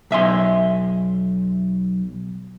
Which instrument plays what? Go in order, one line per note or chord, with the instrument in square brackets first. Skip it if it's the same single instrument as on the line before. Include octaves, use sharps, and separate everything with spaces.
[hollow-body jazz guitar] B1 E5 G#5 C6